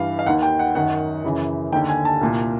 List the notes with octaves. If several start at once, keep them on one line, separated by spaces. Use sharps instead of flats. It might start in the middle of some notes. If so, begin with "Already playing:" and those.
Already playing: G2 E3 F5
F5
D#2 D#3 F#5
G5
F#5
F#2 D#3 F#5
F#2 C#3 E3
D#2 D3 G5
G#5
A5
C2 A#2